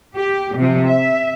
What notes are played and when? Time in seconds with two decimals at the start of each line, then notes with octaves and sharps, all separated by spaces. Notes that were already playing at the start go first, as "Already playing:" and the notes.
0.16 G4
0.56 C3 F3
0.87 E5